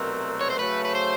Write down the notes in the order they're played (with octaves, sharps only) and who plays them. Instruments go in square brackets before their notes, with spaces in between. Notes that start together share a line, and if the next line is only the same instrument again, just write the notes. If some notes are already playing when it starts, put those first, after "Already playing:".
Already playing: [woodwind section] C2 B2 F#3 A3 C4 [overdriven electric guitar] A#4
[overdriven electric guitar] C#5
C5
[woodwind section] C#3 F#3 A3 [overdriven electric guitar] B4
[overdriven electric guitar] B4
C5